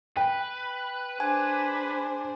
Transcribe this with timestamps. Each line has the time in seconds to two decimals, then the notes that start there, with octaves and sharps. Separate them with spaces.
0.17 B4 G5
1.20 D4 G#4 C5 G#5